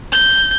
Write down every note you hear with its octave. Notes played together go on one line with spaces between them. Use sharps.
G6